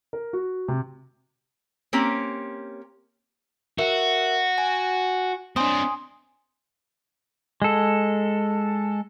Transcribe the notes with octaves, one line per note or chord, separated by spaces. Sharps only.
A#4
F#4
C3
A#3 C4 C#4 G4
F#4 A#4 E5
G#5
C4 D4 G#5 C6 D#6
G#3 A4